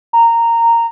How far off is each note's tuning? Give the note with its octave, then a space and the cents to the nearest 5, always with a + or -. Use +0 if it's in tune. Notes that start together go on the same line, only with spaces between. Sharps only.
A#5 -10